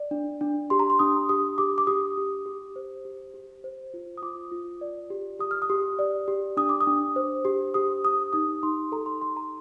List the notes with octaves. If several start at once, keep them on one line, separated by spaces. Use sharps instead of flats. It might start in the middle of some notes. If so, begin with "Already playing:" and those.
Already playing: D5
D4
D4
G4 C6
A#5
C6
D4 D#6
G4 D#6
G4 D6
D6
G4 D#6
G4
G4
C5
G4
G4
C5
F4
D#6
F4 D6
F4
D5
G4
G4 D#6
F6
D#6
G4
D5
G4
D4 D#6
D6
D#6
D4
C5
G4
G4 D#6
G4 D#6
D#4 D#6
D#4 C6
A4 A#5
C6
A4 C6
A#5